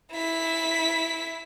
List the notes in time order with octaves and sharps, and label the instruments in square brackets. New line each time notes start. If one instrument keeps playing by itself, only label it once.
[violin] E4 B6